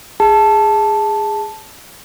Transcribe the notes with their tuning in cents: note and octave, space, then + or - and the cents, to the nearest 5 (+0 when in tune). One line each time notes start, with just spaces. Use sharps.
G#4 -15 A5 -5